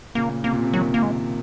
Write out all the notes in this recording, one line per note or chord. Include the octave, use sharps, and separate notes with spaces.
A#2 C#3 A#3
C3 A#3
A#2
C3
C3 D#3 F#3
A#3
G#3